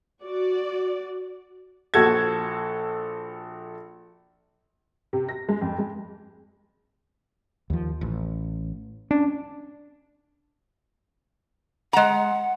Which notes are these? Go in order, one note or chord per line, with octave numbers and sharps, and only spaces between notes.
F#4 D5
A#1 F#4 A4 G#6
C3
A#6
G#3
F2
G#3
D#2 F3
A1
C#4 D4
G#3 F#5 A#5